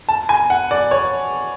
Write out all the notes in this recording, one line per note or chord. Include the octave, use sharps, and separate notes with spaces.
A5
G#5
F#5
D5
C#5